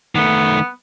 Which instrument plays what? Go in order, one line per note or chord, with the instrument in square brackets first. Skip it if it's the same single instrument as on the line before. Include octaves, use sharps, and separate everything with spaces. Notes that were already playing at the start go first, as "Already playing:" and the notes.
[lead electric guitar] D#3 A3 [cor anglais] B3